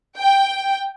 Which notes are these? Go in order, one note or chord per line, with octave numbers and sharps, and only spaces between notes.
G5